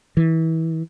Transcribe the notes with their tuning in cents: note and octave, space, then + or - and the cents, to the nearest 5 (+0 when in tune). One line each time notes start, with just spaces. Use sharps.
E3 -25